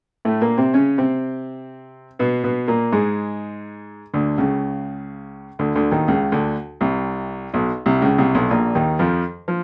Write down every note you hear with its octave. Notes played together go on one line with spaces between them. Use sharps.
A2 A3
A#2 A#3
C3 C4
C#3 C#4
C3 C4
B2 B3
B2 B3
A#2 A#3
G#2 G#3
D2 D3
C#2 C#3
D2 D3
D2 D3
D#2 D#3
C#2 C#3
D2 D3
C2 C3
B1 B2
C2 C3
C#2 C#3
C2 C3
B1 B2
A#1 A#2
D#2 D#3
F2 F3
F3